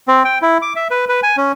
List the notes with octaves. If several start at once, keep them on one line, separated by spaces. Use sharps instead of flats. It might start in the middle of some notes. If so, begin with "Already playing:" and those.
C4
G5
E4
D6
E5
B4
B4
G#5
C#4